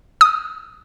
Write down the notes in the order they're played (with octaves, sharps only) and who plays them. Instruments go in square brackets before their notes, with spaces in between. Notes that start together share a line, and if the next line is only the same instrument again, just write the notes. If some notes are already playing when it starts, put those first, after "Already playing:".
[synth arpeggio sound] D#6